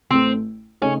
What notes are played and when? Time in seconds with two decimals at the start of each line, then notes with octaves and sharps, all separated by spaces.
0.11 A1 A2 A3 C4
0.81 C#3 A3 C#4 D#4 A4